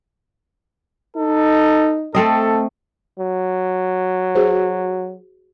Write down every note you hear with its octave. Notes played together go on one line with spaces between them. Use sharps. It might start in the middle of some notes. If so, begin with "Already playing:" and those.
D#4 A4
A3 C4 A4 D#5
F#3
F#4 G#4 C5